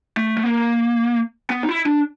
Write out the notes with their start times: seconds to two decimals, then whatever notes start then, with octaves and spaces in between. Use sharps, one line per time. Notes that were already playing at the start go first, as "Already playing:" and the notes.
0.17 A3
0.37 A3
0.43 A#3
1.50 B3
1.63 D#4
1.68 E4
1.86 D4